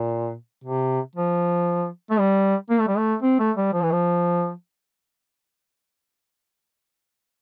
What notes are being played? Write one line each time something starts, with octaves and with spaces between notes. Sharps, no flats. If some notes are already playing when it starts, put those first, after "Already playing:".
Already playing: A#2
C3
F3
A3
G3
A#3
A3
G3
A3
C4
A3
G3
F3
E3
F3